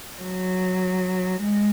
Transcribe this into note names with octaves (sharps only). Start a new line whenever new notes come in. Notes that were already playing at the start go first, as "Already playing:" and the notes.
F#3
G#3